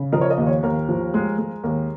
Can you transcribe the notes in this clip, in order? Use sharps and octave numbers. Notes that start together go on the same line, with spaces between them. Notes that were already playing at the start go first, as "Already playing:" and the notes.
Already playing: C#3
F3 A#4 D#5
C#5
A#4 D#5
D#2
C#5
D#2 A#4
F3
G#3
G#3
D#2 A#4